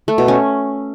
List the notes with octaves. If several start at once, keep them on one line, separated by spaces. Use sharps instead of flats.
A3
B2
C#4